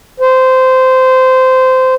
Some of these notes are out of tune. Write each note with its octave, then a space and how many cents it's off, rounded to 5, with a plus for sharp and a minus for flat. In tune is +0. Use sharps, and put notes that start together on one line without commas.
C5 -15